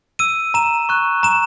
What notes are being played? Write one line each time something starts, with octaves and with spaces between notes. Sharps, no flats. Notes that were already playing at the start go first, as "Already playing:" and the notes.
E6 D#7
A#5 E7
C#6 F#6
A#5 E7